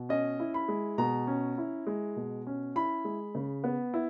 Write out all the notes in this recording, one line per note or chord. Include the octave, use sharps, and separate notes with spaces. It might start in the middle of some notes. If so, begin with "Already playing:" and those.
Already playing: B2
C#4 D#5
E4
B5
G#3
B2 A#5
C#4
E4
G#3
B2
C#4
E4 B5
G#3
C#3
B3
E4